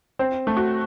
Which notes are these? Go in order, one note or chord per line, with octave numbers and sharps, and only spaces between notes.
C4 C5
A3
F#4